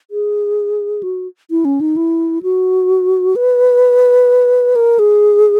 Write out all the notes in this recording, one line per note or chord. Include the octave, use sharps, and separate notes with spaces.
G#4
F#4
E4
C#4
D#4
E4
F#4
B4
A#4
G#4